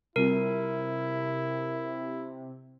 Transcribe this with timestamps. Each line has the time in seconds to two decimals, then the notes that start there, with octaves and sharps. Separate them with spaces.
0.16 C3 G3 C4 E4 F4 A#4